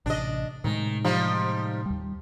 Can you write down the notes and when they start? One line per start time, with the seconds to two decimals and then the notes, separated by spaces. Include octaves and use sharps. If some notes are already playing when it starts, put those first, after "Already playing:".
0.06 A1 C3 D4 D#5
0.64 A2 C3 D#3 G#3
1.05 F3 G3 D#4
1.86 D#2 G3